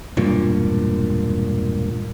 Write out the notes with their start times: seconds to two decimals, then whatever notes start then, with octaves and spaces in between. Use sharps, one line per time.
0.17 E1 G2 A#2